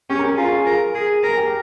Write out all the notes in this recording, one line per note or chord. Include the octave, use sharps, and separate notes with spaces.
C#4 G4 G5
A#4 A#5
G#4 G#5
F4 A#4 A#5
G#4 G#5
A#4
G#4
G#4 A#4 G#5
G4 G5